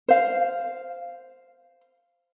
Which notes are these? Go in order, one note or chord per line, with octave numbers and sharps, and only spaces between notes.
C5 F5